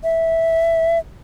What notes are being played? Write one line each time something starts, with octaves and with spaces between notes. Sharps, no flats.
E5